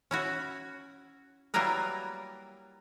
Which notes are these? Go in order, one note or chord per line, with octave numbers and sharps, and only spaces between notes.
C#4 E4 F#4
F#3 G3 A#3 E4 A#4 B4